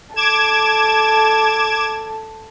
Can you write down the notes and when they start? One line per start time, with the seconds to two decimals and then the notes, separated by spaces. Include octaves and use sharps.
0.15 A4 D6 G#6 E7